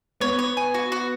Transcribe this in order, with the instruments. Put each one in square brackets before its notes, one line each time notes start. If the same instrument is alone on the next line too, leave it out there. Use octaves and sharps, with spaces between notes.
[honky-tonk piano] B3 [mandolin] C#5
[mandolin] C#5
G#5
F#4
F#4